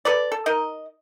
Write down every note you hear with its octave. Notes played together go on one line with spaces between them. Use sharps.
A4 B4 D5
A4
D#4 A#4 D#5